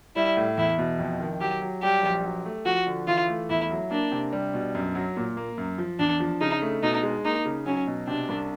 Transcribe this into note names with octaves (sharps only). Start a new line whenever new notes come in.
G3 E4
A2
E2 E4
B2
F2
D#3
F#3 G4
F#3
G3 G4
A#1
F#3
A3
F3 F#4
D3
E3 F4
A3
E2 E4
F#3
A#3 D4
C3
G3
B2
F#2
F#3
A#2
A#3
F#2
F3
E2 D4
F3
C#3 D#4
A3
B2 D#4
G#3
A#3 D#4
C#3
F#3 C#4
B2
C3 D4
C2